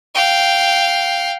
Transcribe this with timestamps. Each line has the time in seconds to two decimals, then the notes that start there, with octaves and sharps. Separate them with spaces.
0.15 F5 G5